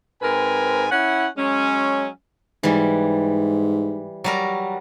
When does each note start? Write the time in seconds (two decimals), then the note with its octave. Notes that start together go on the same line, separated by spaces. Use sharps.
0.22 G#2 C4 A#4 B4 G#5
0.91 C#4 E4 F#5
1.37 F#3 G#3 C#4
2.63 G#2 E3 G3
4.24 F#3 G3 A#4